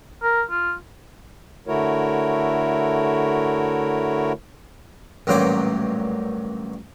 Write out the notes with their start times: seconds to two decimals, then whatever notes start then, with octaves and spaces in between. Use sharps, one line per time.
0.23 A#4
0.50 F4
1.66 D3 A3 E4 F#4 A#4 C#5
5.27 A1 G2 A#2 F#3 C5 D6